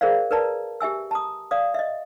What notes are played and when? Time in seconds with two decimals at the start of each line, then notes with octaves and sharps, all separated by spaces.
0.01 G#4 A#4 C5 D5 F5
0.31 A#4 B4 D5 A5 A#5
0.80 G4 E5 G#5 E6
1.11 A5 A#5 D#6
1.51 D5 F5 D#6
1.74 D#5 E5